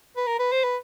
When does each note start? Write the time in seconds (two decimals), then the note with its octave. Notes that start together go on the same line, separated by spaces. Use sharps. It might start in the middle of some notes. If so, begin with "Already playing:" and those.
0.17 B4
0.27 A#4
0.40 B4
0.52 C5
0.64 B4